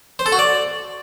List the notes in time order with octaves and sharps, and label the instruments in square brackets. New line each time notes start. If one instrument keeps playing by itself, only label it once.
[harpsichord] C5
A4
F#4
D5